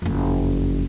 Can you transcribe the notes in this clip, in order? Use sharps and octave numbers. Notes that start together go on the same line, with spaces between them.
F#1 F2